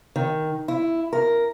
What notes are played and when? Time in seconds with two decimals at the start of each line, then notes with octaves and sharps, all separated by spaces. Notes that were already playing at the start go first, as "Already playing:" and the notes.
0.16 D#3
0.68 E4
1.13 A#4